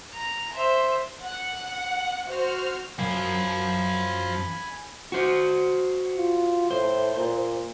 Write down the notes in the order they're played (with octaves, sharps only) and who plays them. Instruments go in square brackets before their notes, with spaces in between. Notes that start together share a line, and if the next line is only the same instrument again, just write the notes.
[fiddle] A#5
C5 E5
[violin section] F#5
F#4 C5 F6
[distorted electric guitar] F#2 [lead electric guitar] C5 F5 [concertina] G#5 B5
[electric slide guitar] F#4 C5
[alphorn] F4
[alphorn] A2 [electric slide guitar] C5
[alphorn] A#2